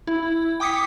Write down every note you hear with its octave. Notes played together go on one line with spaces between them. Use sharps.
E4
G5 D6 D#6 B6 C#7